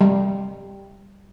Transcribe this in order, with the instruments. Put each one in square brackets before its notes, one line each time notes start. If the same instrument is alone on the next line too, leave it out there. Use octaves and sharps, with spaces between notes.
[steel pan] G3